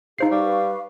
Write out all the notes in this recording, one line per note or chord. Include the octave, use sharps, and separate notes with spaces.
D#4 G#4 C5 F5 C7
G3 B4 F5 C#6